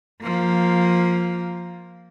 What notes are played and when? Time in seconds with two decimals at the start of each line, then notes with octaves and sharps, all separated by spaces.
0.22 F3 A#3